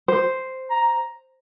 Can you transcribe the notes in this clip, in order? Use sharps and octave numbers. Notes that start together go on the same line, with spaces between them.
C5
A#5